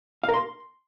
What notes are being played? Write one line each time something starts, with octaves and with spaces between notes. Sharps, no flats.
F5
A#4
C6